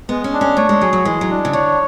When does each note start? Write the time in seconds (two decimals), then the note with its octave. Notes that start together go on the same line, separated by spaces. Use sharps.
0.09 G#3 B3
0.24 C#4
0.33 D4
0.41 C#4
0.57 A3 C#5
0.69 G#3
0.81 F#3 G#4
0.93 F#3
1.05 E3 G#3
1.21 F#3
1.30 D4
1.45 C#3
1.53 D3 C#5